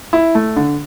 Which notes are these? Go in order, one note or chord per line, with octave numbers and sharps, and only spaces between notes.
E4
A3
D3